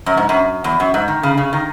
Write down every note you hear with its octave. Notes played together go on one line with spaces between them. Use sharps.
F#2
G#2
F#2
E2
F#2
G#2
D#3
C#3
C#3
D#3